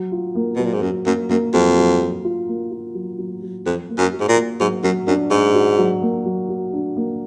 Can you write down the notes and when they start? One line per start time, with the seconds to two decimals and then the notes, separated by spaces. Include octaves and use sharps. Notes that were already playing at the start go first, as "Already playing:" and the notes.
Already playing: F#3
0.12 F4
0.35 A#3
0.56 B2 F#3
0.65 A#2
0.73 G#2
0.82 F#2 F#3
1.06 F#2 A#3
1.30 F#2 A#3
1.53 F2 F#3
1.77 F#3
2.01 F#3
2.24 F4
2.48 A#3
2.71 F4
2.95 F#3
3.18 F#3
3.42 F#3
3.66 F2 F#4
3.89 A#3
3.98 F#2
4.13 F#4
4.20 G#2
4.28 A#2
4.36 A#3
4.60 G#2 F#3
4.84 F#2 F#3
5.07 F#2 D4
5.31 G#2 D4
5.55 F#4
5.78 F#3
6.02 A#3
6.25 F#3
6.49 F#4
6.73 D4
6.96 A#3